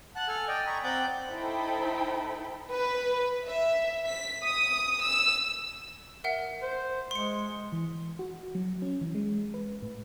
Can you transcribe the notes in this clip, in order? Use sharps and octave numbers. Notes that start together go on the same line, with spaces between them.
F#5 A5 F#6
A4 G#5 F6
D5 D#5 G5
D#5 G#5 A#5 B5 C#6
C4 D5 F#5 G5 D6 G6
D#4 E4 A4 C5 G5 B5
B4
E5
B6
D#6
E6
A#4 E5 F#5
C5
G#3 C6 C#7
E3
F#4
F#3
C#4
E3
G#3
B4
A2